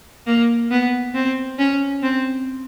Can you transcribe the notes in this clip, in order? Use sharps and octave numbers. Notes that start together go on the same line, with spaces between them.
A#3
B3
C4
C#4
C4